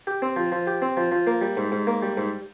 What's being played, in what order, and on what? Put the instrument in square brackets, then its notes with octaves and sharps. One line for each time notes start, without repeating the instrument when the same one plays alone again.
[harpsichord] G4
C4
F3
F3
G4
C4
F3
F3
A#3
G3
G#2
G#2
A#3
G3
G#2